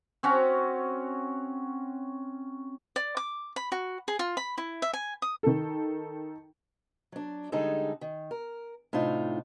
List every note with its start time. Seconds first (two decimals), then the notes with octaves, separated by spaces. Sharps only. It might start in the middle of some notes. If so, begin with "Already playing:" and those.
0.23 C4 C#4 F#4
2.96 D5
3.17 D6
3.56 B5
3.72 F#4
4.08 G#4
4.19 F4
4.37 B5
4.58 E4
4.82 E5
4.93 G#5
5.22 D#6
5.43 D#3 A4
7.12 F#3 D4
7.52 D3 G3 G#3 D#4 G#4 A4
8.01 D#3
8.31 A#4
8.93 A2 C3 D4 D#4 F4